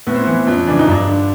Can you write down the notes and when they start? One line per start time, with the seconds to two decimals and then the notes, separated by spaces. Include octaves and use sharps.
0.07 A2 B3
0.15 C4
0.24 E3 B3
0.47 F2 C#4
0.67 C#3 E3 D4
0.79 D#4
0.88 G2 D4
1.08 D3